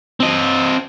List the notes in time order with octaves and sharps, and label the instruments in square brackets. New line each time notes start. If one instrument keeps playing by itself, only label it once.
[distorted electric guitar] C4 D#5